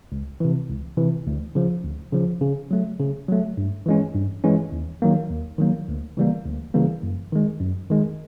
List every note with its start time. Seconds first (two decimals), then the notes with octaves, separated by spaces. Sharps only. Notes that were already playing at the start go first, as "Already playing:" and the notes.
0.12 C#2
0.40 C3 E3
0.69 C#2
0.97 C3 E3
1.27 D2
1.55 C#3 F3
1.84 D2
2.12 C#3 F3
2.41 C#3
2.71 F#3 A3
3.00 C#3
3.29 F#3 A3
3.57 G2
3.86 E3 G#3 C#4
4.14 G2
4.44 E3 G#3 C#4
4.72 D#2
5.02 D#3 F#3 A#3
5.30 D#2
5.58 D#3 F#3 A#3
5.88 D2
6.17 C#3 E3 G3 A#3
6.46 D2
6.74 C#3 E3 G3 A#3
7.03 F#2
7.33 D#3 G#3
7.61 F#2
7.90 D#3 G#3